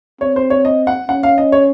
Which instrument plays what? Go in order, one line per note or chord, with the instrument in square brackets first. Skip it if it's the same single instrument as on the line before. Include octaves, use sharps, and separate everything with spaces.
[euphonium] C4 [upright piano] C#5
[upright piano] C5
C#5
D#5
F#5
[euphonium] C#4 [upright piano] F#5
[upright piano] F5
D#5
C#5